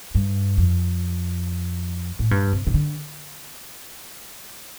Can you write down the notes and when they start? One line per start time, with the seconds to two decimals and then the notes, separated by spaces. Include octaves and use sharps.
0.15 G2
0.58 F2
2.19 A2
2.31 G2
2.53 C3
2.67 C3
2.74 D3